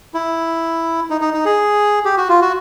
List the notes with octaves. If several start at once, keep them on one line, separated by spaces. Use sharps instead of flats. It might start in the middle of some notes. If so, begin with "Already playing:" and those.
E4
D#4
D#4
D#4
G#4
G4
F#4
F4
F#4